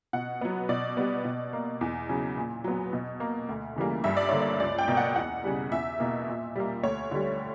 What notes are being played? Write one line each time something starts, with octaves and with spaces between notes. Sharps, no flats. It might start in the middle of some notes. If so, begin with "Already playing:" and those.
B2 F#5
F#3 B3
B2 D5
G3 B3
B2
A#3
E2
C#3 F#3
A#2
F#3 B3
B2
A#3
D2
C#3 E3 G3 A#3
G2 E5
D5
D3 A#3 C#5
D5
C#2 D5
G5
B2 A#3
F#5
E2 F#5
C#3 G3
E2 E5
B2 A#3
A#2
G3 A#3
D2 C#5
D3 G3